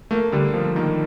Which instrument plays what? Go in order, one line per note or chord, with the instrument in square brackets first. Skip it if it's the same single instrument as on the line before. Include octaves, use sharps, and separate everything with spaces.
[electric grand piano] A3 [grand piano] A#3
[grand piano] D3 [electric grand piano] G3
[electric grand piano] F3 [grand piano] A#3
[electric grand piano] D#3 [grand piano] A#3